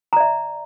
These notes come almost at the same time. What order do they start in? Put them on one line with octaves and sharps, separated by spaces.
A#5 D5 E5